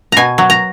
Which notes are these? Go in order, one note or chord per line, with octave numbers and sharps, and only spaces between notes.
B2 G#5 A#5
F#3
A#5